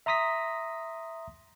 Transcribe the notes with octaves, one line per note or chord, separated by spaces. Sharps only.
E5 A#5 C6 D#6 A#6 B6